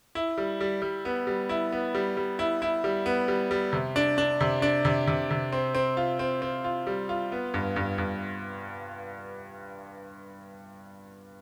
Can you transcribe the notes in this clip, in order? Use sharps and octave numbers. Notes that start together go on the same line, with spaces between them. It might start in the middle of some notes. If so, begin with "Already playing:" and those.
E4
G3
G3
G3
B3
G3
E4
B3
G3
G3
E4
E4
G3
B3
G3
G3
C3
D4
D4
C3
D4
C3
C3
C3
C4
C4
F4
C4
C4
F4
G3
F4
B3
G2
G2
G2